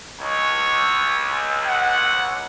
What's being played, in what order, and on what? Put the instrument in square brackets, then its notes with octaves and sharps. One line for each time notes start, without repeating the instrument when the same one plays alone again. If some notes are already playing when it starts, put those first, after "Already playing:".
[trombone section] C#2 [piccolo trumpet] C#5
[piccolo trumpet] F#5